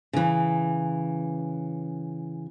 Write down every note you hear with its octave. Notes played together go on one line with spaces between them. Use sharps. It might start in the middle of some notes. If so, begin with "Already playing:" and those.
C#3 E3